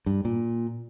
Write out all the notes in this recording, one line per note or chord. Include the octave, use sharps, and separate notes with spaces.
G2
A#2